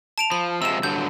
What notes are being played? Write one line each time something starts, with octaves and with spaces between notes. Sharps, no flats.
A5 D7 F7
F3 B5
C3 F3 G#3 E6 E7
G2 D3 F#3 G6